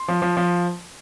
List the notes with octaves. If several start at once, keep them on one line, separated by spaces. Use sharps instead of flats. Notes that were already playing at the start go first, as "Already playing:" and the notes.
Already playing: C6
F3
F3
F3